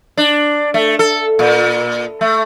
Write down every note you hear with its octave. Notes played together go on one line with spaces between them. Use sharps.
D4
A3
A4
A#2
A3